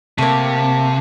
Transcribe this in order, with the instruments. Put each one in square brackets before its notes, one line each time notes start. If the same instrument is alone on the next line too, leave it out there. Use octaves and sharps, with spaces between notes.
[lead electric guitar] C3 [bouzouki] A3 A#3